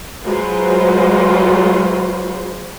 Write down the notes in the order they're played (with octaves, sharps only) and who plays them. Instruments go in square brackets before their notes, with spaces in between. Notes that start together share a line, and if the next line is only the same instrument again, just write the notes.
[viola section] F#3 G#3 F4 B4 C5